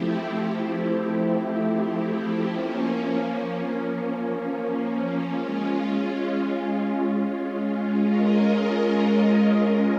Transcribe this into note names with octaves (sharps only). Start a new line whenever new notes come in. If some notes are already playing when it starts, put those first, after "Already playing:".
Already playing: F3 A3 C4 E4 G4
F3 A#3 C#4
G#3 C#4 F4
G#3 C#4 F4 A#4 D#5